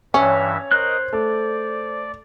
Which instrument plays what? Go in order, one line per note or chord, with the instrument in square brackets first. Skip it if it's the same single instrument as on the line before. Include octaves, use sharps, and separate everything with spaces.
[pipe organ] G2 E3 E5 [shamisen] C#4 [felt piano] C#5
[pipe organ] A#4 D#5 [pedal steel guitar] C5 F#6
[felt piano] A3 [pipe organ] D5